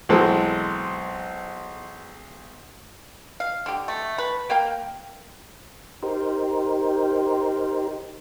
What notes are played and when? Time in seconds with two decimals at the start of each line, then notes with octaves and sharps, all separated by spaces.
0.09 B1 E3 G#3 C4 A4
3.40 F5
3.66 D3 G4
3.88 A3
4.18 B4
4.50 A#3 F5 G5
6.03 D#4 G4 A#4 C5